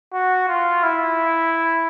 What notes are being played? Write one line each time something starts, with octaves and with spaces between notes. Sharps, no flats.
F#4
F4
E4